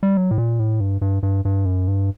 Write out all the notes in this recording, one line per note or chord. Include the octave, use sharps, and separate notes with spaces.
G3
F#3
A2
A#2
A2
G2
G2
G2
G2
F#2
G2